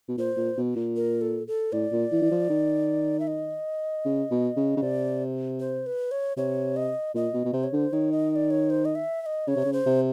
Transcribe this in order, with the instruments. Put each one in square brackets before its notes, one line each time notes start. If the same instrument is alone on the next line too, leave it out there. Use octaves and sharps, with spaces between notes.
[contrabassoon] B2
[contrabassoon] A#2 [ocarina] C5
[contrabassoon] A#2
B2
A#2
[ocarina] A#4
A4
A4
[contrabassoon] A2 [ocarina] D5
[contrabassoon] A#2
E3
E3
F3
D#3
[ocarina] E5
D#5
[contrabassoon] C#3
B2
C#3
C#3
[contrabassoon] C3 [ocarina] D5
[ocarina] C5
B4
C#5
[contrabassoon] C3 [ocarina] C#5
[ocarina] D#5
[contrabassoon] A#2 [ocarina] D#5
[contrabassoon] B2
B2
[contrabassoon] C3 [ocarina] C5
[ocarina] C#5
[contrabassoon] D3 [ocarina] C5
[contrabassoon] D#3 [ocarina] C#5
[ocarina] D#5
D#5
D5
C#5
C5
D#5
E5
E5
D#5
[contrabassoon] C#3 [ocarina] C#5
[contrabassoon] C3
C#3
[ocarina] C5
[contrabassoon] C3